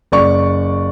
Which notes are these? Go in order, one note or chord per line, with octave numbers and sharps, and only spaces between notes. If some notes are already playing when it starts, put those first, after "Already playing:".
F#1 D5 C#6